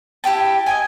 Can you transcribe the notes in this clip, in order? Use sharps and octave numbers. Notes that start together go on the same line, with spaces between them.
E4 G4 G5 A5
D#5 G5 G#5